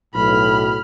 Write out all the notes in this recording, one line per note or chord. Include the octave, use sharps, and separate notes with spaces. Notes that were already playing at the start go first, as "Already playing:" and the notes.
B1 A2 B5 F6